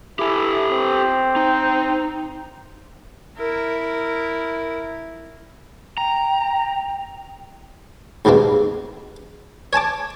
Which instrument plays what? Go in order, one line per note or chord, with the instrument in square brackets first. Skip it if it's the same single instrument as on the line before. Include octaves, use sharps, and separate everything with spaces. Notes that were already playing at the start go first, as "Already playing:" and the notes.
[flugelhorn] E4 [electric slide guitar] G4 A4
[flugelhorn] C4
[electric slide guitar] D#4
[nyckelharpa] E4 A#4
[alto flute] G5 [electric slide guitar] A#5
[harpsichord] D#2 G#2 B2 A#3 C4
C#5 G#5 A5 D6